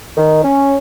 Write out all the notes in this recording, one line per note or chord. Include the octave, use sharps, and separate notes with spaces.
D#3
C#4